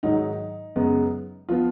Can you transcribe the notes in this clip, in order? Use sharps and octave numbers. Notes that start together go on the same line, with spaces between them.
G#2 D#3 F#3 D#4
F#2 C#3 G#3 B3
F3 B3 F4